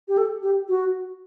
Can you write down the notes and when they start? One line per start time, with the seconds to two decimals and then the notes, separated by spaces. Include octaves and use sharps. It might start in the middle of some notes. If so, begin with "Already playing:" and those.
0.08 G4
0.18 A4
0.43 G4
0.69 F#4